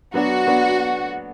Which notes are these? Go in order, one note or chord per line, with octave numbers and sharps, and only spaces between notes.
F#3 B3 D4 F#4
F#3 B3 D4